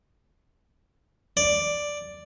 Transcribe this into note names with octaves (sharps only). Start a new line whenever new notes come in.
D5